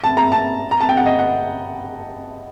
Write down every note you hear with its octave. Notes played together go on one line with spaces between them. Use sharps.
A5
A#5
A5
A#5
A5
G5
F#5
D#5
F#5